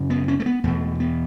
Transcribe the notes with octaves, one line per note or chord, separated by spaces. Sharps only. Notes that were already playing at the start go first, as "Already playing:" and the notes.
Already playing: F#2 C#3
B3
C#4
A3
B3
E2 B2 A3
B3